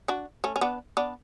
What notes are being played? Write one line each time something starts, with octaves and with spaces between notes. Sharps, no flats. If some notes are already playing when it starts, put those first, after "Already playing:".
D4 F#4
A3 C#4
C#4
B3 D4
B3 D4